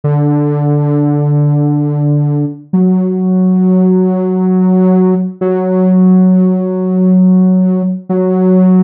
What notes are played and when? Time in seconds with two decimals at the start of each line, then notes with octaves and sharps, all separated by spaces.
0.04 D3
2.73 F#3
5.41 F#3
8.09 F#3